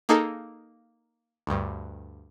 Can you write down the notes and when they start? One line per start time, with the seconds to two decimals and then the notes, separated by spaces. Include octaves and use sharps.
0.09 A#3 D#4 G#4 A4
1.47 D2 G2